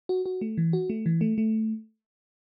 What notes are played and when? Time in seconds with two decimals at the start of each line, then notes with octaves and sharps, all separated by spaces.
0.09 F#4
0.26 F#4
0.41 A3
0.58 E3
0.73 F#4
0.90 A3
1.06 E3
1.21 A3
1.38 A3